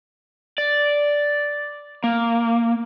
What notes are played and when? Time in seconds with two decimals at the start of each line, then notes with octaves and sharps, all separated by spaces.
0.58 D5
2.04 A#3